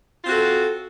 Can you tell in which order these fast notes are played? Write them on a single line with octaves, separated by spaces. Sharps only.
F4 C4 F#4 A4